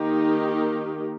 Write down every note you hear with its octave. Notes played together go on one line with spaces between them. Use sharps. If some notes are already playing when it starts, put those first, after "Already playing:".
Already playing: D#3 A#3 D#4 G4